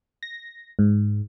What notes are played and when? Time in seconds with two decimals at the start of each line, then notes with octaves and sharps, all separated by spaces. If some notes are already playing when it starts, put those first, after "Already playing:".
0.23 A#6
0.79 G#2